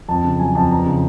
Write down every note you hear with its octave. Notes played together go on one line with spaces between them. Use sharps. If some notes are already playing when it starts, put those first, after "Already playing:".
F2 A5
C#3
F#3 G#5
F2 A5
E2 A#5
C#3